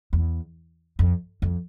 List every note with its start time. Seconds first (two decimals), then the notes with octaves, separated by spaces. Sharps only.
0.13 E2
0.99 F2
1.42 F2